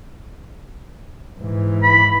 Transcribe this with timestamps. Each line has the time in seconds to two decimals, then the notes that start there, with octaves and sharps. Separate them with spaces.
1.39 G#2 E3
1.83 B5